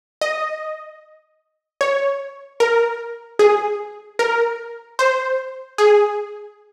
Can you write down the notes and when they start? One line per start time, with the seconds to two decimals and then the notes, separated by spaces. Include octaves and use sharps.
0.21 D#5
1.81 C#5
2.60 A#4
3.39 G#4
4.19 A#4
4.99 C5
5.78 G#4